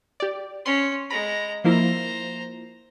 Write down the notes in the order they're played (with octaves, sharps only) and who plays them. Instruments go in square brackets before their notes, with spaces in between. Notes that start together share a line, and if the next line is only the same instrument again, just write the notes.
[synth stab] G4 D5
[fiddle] C#4 [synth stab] C6
[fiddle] G#3 A#5 [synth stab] B5
[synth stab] F3 A#3 E4 [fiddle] C5 A#5